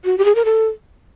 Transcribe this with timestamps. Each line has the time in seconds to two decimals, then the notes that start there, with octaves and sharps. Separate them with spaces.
0.05 F#4
0.18 G4
0.25 G#4
0.35 A#4
0.45 A4